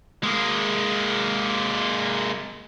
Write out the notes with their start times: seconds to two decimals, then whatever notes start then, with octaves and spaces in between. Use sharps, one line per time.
0.24 G#3 A#3